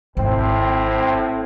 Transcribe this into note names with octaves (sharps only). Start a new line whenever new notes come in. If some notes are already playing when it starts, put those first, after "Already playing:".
G#1 A2 C4